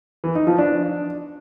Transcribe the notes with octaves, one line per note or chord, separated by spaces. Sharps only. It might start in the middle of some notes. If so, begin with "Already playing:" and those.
E3
D#4
F3
D4